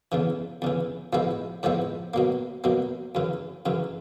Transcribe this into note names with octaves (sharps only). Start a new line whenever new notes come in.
E2 C#3 E3
E2 C#3 E3
A2 F3 G#3 B3 E4
A2 F3 G#3 B3 E4
B2 F#3 A#3
B2 F#3 A#3
F#2 C#3 E3
F#2 C#3 E3